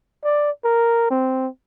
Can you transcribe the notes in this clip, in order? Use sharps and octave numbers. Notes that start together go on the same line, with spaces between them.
D5
A#4
C4